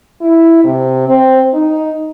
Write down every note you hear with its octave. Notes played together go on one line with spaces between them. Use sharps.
E4
C3
C4
D#4